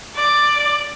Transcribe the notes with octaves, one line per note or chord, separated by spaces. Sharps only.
D5